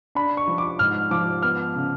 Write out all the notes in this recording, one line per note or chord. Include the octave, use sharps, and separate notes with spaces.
D4 B5
C#6
F3
D6
G#2 F6
F3 D6
B3 F6
C#3